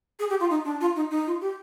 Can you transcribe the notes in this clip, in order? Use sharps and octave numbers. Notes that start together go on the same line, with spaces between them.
G#4
G4
F4
D#4
D4
F4
D#4
D#4
F4
G4